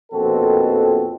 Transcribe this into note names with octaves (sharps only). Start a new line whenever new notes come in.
A#1 F2 B2 C4 F#4 A4